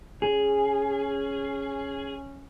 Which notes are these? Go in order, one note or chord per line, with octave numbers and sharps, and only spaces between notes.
C#4 G#4